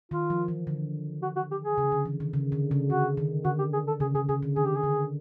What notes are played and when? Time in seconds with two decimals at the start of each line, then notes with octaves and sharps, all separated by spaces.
0.11 D#3 F4
0.30 F3
0.48 E3
0.67 D3
1.22 F#4
1.36 F#4
1.51 G4
1.64 G#4
1.78 C#3
1.92 D3
2.05 E3
2.20 D#3
2.33 C#3
2.52 D3
2.71 C#3
2.89 D3 F#4
3.17 D#3
3.45 D3 F#4
3.59 G4
3.73 G#4
3.87 A4
4.00 C#3 G#4
4.15 C#3 G#4
4.29 C#3 G#4
4.43 D3
4.56 D#3 G#4
4.65 G4
4.76 G#4
4.83 D3